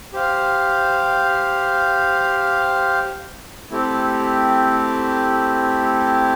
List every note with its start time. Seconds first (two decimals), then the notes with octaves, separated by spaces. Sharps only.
0.13 G4 C5 F5
3.71 A3 C4 E4 G4